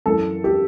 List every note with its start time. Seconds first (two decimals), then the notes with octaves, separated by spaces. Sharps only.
0.06 F#2 E3 A4
0.44 G4